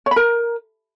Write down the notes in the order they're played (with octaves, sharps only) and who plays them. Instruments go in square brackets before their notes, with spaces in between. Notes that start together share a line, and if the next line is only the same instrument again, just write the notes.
[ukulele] C#5
B5
A#4